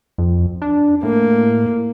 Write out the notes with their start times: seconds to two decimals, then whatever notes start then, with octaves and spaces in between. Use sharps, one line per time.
0.18 F2
0.62 D4
1.03 A2 A#3